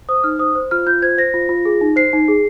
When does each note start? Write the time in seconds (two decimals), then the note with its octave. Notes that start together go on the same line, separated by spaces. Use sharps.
0.09 C5 D#6
0.24 D#4 F6
0.39 C5 D#6
0.55 C5
0.71 F4 F6
0.87 F4 G6
1.02 C5 G#6
1.18 C5 A#6
1.34 F4
1.49 F4
1.65 G#4
1.81 D#4
1.96 C5 C7
2.13 D#4
2.28 G#4